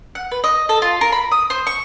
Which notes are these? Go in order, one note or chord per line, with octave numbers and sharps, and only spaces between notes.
F#5
B4
D#5
A4
F4
A#4
B5
D#6
C5
C#6